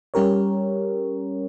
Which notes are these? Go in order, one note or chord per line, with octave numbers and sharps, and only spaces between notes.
G3 C#4 G4 A#4 C#5